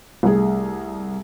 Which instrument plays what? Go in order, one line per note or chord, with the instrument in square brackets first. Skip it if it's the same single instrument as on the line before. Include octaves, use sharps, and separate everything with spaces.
[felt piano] C2 A3 G#4